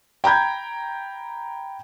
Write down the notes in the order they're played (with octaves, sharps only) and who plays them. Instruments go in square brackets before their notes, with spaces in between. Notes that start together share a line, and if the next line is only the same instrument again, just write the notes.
[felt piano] G5 A#5 B5 G6 G#6